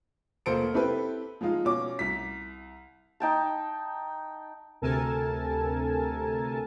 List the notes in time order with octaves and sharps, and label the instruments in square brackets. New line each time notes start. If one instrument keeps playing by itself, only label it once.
[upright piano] F1 A#3 A4 C5 C#7 D7
C4 E4 G4 A4 B4
F3 G#3 D#4 F4
B2 C#4 D6
C2 B6
[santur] D#4 G5 A5
[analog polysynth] D2 C3 A4 A#4 G#5 A5